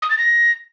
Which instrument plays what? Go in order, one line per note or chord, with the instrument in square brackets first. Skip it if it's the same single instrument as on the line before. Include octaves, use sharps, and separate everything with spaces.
[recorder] D#6
A6
A#6